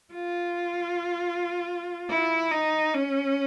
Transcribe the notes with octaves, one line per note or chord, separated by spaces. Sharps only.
F4
E4
D#4
C#4